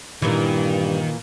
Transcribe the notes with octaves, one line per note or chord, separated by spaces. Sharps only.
G2 A#2 D#3 E3